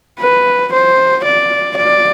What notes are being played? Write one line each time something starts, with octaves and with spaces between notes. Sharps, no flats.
B4
C5
D5
D5